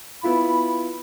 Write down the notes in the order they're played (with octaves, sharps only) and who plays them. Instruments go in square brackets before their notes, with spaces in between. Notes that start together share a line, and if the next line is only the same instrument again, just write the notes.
[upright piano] B3 E4 F4 [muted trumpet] B5